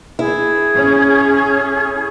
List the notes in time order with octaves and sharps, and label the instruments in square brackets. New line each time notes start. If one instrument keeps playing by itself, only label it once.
[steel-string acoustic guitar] E4 [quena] G#4
[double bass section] C#4